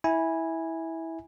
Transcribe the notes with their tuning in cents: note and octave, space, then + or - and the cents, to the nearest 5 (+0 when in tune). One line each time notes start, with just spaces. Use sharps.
E4 -15 G#5 -10